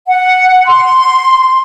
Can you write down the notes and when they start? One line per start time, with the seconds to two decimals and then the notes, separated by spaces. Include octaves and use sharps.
0.08 F#5
0.66 C6